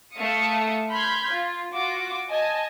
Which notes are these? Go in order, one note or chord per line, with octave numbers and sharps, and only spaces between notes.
A3 A4 E5 F5 D#6 C#7
B5 C6 F6 G6 G#6 B6
F4
F4 F#4 D6
D#5 G#5 A5